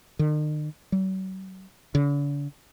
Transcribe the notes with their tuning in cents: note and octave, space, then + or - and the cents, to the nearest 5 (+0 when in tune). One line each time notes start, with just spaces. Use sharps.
D#3 -45
F#3 +40
D3 -45